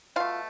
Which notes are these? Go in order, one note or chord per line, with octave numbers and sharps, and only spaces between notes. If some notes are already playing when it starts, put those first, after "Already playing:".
B2 A3 F4 F5